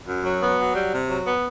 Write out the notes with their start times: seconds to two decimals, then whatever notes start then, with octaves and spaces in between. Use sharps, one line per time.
0.08 F#2
0.25 F#3
0.42 B3
0.58 F#3
0.75 G3
0.92 C3
1.09 F#3
1.26 B3